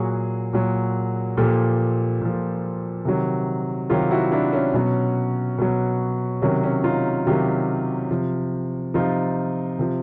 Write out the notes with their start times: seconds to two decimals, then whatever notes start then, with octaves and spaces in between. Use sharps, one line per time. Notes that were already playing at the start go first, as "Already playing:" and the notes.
Already playing: A#2 F#3 F#4 G#4
0.53 A#2 F#3
1.37 A#2 F3 G4 A4
2.21 A#2 F3
3.05 C3 D#3 F#3
3.90 C3 D#3 F#3 F4 G4
4.11 E4 F#4
4.32 D4 E4
4.53 C#4
4.74 B2 F#3
5.58 B2 F#3
6.42 C3 D#3 F#3 C#4
6.63 C#4
6.84 D#4 F4
7.27 C3 D#3 F#3 F4 G4
8.11 C3 F3
8.94 C3 F3 D#4 F4
9.79 C3 F3